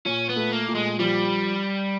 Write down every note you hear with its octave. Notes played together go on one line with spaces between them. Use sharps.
A#2 C#4
B3
A3
A#3
A#2
G#3
F3 G3